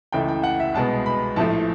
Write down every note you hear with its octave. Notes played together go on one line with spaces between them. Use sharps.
C#2 C#3 E3 A3 G5
G5
F#5
E5
C2 B2 G#3 B3 A5
B5
A#1 A2 F3 A3 A5